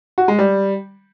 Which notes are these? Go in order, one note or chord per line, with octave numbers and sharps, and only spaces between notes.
F#4
G#3
G3